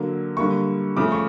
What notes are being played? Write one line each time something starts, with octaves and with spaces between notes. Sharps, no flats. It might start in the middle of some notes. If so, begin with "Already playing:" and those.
Already playing: D3 F#3 A#3
D3 G3 A#3 C#6
C#3 F3 A3 D6
C#6